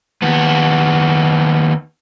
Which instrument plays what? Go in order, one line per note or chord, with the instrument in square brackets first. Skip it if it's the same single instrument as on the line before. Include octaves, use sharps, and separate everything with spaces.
[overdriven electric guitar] D#2 B3